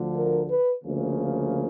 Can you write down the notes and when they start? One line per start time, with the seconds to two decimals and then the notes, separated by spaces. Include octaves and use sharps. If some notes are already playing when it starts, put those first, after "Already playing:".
Already playing: D2 D3 F3
0.16 A#4
0.50 B4
0.82 D2 C#3 F3 A#3